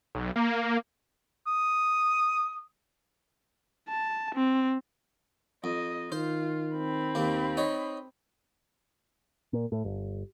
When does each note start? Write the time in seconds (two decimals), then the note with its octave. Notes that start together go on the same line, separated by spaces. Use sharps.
0.15 B1
0.36 A#3
1.47 D#6
3.89 A5
4.35 C4
5.64 F2 D#5
6.12 D#3 F4 C5
6.76 C4 B5
7.15 D#2 A#3
7.57 D#4 C#5 D#5
9.53 A#2
9.72 A2
9.85 G1